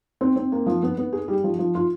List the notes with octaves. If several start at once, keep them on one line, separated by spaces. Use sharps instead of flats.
C4
C4
A#3
F3
B3
B3
G#4
G3
F3
F3
F4